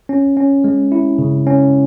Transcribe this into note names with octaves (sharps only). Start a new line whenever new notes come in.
C#4
C#4
G#3
E4
C#3
C#4